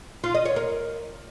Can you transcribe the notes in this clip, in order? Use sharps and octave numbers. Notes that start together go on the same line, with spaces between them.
F4
D#5
C#5
A#4